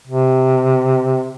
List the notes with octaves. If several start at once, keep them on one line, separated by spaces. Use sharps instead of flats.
C3